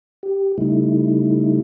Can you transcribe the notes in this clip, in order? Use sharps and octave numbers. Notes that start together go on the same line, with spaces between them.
G4
C#3 G3 A3 D#4 E4